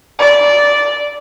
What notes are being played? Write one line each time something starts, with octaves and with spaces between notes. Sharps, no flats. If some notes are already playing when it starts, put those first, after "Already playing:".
D5